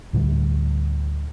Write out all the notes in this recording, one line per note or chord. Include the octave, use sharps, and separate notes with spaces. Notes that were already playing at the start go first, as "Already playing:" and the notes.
D2 A2 D3 G3